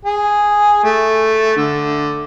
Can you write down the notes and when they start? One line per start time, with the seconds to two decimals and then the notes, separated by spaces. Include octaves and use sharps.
0.05 G#4
0.84 A3
1.56 D3